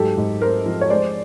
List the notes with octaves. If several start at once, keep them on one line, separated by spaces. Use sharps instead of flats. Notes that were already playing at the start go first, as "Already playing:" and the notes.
Already playing: G#2 F#3 G4 A4
G#2
G#3 A#4 C5
F3
C#5
G#3 C5 D5